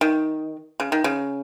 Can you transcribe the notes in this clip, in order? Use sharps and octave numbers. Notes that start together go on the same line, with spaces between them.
D#3
C#3
D#3
C#3